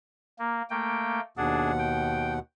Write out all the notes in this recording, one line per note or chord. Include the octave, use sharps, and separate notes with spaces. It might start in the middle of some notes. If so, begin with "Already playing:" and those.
A#3
A3 A#3 G5
D#2 B2 D4 G#4 F#5
G5